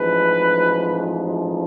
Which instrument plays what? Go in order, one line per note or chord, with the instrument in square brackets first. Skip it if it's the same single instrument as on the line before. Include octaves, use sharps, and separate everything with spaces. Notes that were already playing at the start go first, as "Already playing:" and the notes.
Already playing: [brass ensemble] A1 G#2 F3 B4